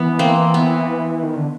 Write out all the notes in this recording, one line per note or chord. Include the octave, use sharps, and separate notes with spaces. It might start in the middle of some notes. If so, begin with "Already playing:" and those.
Already playing: E3 B3
A#3 C4
B3
D#3
D3